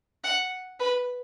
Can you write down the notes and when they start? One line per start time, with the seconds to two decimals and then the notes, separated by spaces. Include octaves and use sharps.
0.24 F#5
0.80 B4